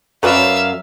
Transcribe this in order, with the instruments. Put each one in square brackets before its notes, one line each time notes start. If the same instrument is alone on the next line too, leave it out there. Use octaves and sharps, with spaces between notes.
[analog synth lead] F#2 [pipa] F#3 B4 D5 [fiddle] E5 E6 [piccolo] F5